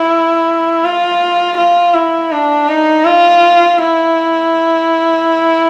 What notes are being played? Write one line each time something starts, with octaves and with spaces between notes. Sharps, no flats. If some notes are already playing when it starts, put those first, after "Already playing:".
Already playing: E4
F4
F4
E4
D4
D#4
F4
E4